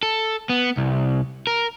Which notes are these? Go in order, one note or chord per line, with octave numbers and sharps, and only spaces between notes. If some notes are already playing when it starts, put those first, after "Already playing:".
A4
B3
C2
A#4